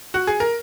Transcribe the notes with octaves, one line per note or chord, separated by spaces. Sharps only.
F#4
G#4
A#4